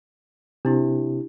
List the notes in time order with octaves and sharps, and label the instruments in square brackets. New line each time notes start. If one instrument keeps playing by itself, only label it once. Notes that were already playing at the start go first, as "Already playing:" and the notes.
[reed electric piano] C3 [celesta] D4 E4 G4